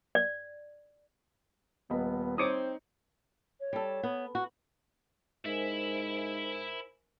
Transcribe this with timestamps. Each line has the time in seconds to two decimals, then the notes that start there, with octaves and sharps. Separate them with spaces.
0.15 D5
1.90 D#1 B3 D#5 B5
2.38 C4 D#4 C5 C#5 D6 D#6 C#7
3.60 C#5
3.73 G3 A4
4.03 B3
4.35 F#4
5.45 G#2 E4 A#4 C5 E5 G#5